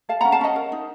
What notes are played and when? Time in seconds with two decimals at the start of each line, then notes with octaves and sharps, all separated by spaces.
0.09 A4 F5 A5
0.21 C#4 F#5 A#5
0.32 F5 A5
0.41 C#4 D#5 F#5
0.56 A#4
0.72 D#4